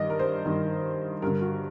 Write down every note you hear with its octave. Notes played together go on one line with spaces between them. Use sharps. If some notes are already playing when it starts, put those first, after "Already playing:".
Already playing: G2 D#3 D5 D#5
A#4
C5
G2 D#3
G2 D3 A#4
F#4